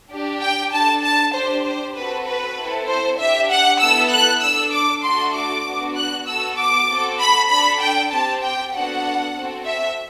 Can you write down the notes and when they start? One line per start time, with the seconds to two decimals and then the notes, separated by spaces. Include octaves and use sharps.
0.11 D4 G4
0.41 G5
0.72 D4 A4 A5
1.02 A5
1.33 D4 G4 C5
1.64 C5
1.95 C4 F#4 A4 B4
2.25 B4
2.57 C4 E4 A4
2.87 C5
3.19 D4 G4 E5
3.50 F#5
3.80 B3 E4 A4 E6
4.11 F#6
4.41 D4 A4 E6
4.72 D6
5.03 A3 D4 F#4 A4 C6
5.35 D6
5.65 B3 D4 F#4
5.96 F#6
6.26 B3 F#4 A4 E6
6.57 D6
6.88 C4 F#4 A4
7.19 B5
7.49 D4 A4 B5
7.80 G5
8.11 C4 G4 A5
8.41 G5
8.72 B3 D4 F#4 A4 F#5
9.34 C4 F#4 A4
9.65 E5